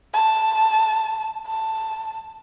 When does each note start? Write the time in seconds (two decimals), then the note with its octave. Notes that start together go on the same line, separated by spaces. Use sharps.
0.13 A5
1.47 A5